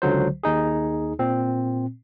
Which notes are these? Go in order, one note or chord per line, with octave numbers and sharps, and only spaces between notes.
C#2 D3 F#3 C5
D#2 D#4 G#4
A#2 C4